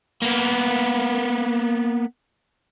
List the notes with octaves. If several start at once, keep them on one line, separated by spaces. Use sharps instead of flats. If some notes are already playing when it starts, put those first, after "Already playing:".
A#3 B3